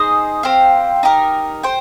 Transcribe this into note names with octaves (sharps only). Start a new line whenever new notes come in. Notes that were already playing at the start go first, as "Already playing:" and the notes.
Already playing: D#4 G#4 C5 D#5
C4 G4 C5 F5
D#4 G4 A#4
C5 G5